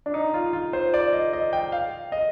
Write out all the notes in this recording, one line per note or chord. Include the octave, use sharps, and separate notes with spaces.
D4
D#4
F4
F4
C5
D5
D#5
D#5
G5
F5
D#5